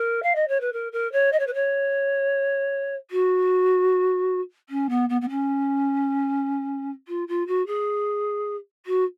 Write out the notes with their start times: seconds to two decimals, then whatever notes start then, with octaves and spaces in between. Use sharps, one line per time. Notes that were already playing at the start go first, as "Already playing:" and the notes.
Already playing: A#4
0.23 F5
0.35 D#5
0.48 C#5
0.60 B4
0.73 A#4
0.92 A#4
1.12 C#5
1.32 D#5
1.39 C#5
1.47 B4
1.54 C#5
3.11 F#4
4.69 C#4
4.89 B3
5.09 B3
5.21 B3
5.29 C#4
7.08 F4
7.28 F4
7.47 F#4
7.67 G#4
8.86 F#4